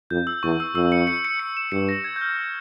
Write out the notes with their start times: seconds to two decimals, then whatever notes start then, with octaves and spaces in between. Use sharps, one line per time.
0.10 F2 G6
0.27 E6
0.43 E2 C#6
0.60 E6
0.75 F2 E6
0.92 C#7
1.07 C#7
1.25 C#7
1.40 C#7
1.57 E7
1.72 G2 C#7
1.89 A#6
2.04 G#6
2.16 G6
2.21 F6
2.37 G6